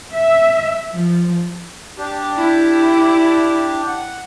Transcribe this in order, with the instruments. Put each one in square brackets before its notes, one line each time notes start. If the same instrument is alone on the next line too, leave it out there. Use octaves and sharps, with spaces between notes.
[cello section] E5
F3
[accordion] D4 G4
[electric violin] E4
[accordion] F#5